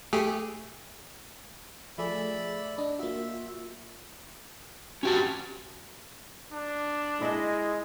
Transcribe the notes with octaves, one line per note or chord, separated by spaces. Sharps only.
A3 G4 G#4
F3 A3 G#4 D5 E5 B5
D4 D#5
A#3 F4 F#4 E5
C#4 F#4 G4 A5
D4
G#3 E4 D#5 E5